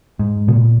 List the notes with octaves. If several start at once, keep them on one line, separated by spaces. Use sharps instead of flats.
G#2
B2
A#2